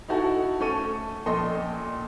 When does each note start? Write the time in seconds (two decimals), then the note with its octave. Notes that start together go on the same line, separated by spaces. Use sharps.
0.08 D#4 E4 F#4 A4 F#5
0.60 A3 C#4 A4 C#6 D#7
1.26 A#1 A#2 A4 D#5 C6